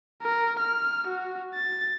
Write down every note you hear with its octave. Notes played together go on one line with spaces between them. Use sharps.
A#4
F6
F#4
A6